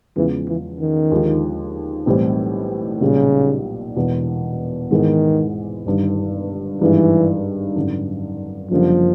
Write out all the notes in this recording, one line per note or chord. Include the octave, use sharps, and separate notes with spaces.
E2 C#3 E3 F3 G#3 B3
E3
D#3
D#2 D3 F3 G#3
B1 A2 E3 G3 C4
B1 A#2 C#3 G3
E1 E2 B2
G#1 G#2 D#3 E3 G#3 B3
G1 G2 D#3
G#1 G2 D#3 E3 G#3
G#1 F#2 D3
F#1 F#2 D3 F3 G3 A#3